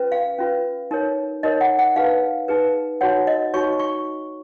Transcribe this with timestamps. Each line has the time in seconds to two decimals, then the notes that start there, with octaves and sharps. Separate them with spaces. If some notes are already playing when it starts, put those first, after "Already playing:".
Already playing: C#4 F4 B4
0.12 F5
0.39 C#4 F4 B4
0.91 D#4 A#4 C#5
1.43 D#4 A#4 C#5 D#5
1.61 F#5
1.79 F#5
1.96 D#4 G#4 B4 F5
2.48 D#4 G#4 B4
3.01 D#4 F#4 C#5 F#5
3.27 D#5
3.54 D#4 F#4 C#5 C#6
3.79 C#6